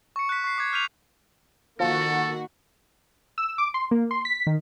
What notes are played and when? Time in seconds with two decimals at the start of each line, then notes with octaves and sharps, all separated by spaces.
0.16 C#6 C#7
0.29 F#6 B6
0.44 C#6 C7
0.58 D6 G#6
0.73 F6 G6 B6 D#7 F7
1.80 D#3 F3 A#3 F#4 A4
3.38 E6
3.58 D6
3.74 C6
3.91 A#3
4.11 C6
4.25 B6
4.47 D#3